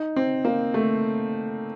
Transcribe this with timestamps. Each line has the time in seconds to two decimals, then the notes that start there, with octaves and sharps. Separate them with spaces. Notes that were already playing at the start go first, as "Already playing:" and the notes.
Already playing: D#4
0.16 C4
0.45 A#3
0.74 A3